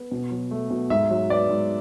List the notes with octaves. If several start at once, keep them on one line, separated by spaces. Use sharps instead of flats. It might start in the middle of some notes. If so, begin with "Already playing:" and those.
Already playing: B3
B2
F#3
A3
B2
G#2 E5
F#3
B3 D5
G#2